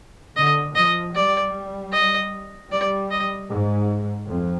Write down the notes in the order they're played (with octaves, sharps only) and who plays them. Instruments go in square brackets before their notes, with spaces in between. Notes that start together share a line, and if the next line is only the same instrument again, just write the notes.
[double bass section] D3 [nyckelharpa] D#5
[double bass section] F3 [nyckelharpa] D#5
[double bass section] G3 [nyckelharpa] D5
[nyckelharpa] D#5
[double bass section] G3 [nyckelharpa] D5
[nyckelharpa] D#5
[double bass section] G#2
F2